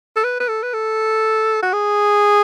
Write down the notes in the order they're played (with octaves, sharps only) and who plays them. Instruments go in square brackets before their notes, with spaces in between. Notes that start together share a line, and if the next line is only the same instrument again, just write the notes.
[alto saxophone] A4
B4
B4
A4
B4
A4
F#4
G#4